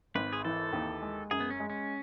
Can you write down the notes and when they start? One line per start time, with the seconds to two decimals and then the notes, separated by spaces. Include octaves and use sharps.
0.15 G#1 B4
0.33 G#4
0.45 E3 A4
0.73 D#2
1.02 G#3
1.31 F#2 G#4
1.40 B3
1.50 C#4
1.60 G#3
1.70 C#4